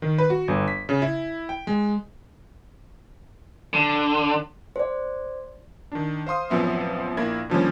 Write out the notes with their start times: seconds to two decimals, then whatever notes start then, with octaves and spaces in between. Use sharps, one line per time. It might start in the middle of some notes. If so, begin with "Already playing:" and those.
0.02 D#3
0.18 B4
0.30 F#4
0.48 G1
0.68 B6
0.89 C#3
1.02 E4
1.49 G5
1.67 G#3
3.73 D3
4.76 C5 D5
5.92 D#3 D4
6.27 C5 F5 C6 D#6
6.50 A1 F#2 F3 B3 C4 E5
7.17 A#1 A#3 E4 A#4 G#6
7.50 D3 D#3 F3 G3 A#3 C#4